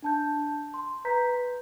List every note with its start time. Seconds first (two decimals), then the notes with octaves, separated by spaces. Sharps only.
0.02 D4 A5 G6
0.74 C6
1.05 B4 A#5 G6 B6